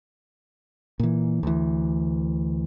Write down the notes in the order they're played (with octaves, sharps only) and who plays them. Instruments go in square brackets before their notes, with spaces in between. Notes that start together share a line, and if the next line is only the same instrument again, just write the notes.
[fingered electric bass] A#2 E3
D2 E3